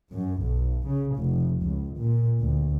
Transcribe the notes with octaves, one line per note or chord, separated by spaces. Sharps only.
F#2
B1
C#3
F1
C#2
A#2
D2